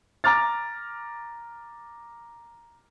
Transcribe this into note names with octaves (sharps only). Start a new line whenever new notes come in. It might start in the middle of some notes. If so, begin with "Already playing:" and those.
A#5 D6 F6 A6